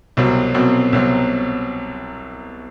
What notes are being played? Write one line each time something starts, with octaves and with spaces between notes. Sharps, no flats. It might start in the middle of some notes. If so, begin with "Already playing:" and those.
C2 B2 F#3 C4
C2 B2 F#3 C4
C2 B2 F#3 C4